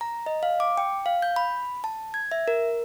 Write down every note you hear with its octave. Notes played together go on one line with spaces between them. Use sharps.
A#5
D#5
F5
D6
G5
F5
G6
B5
A5
G#6
E5
A#4